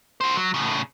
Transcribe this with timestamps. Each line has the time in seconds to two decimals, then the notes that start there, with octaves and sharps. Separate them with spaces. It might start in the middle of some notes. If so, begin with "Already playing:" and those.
0.21 F#4 C5
0.36 F#3
0.54 A2 C#3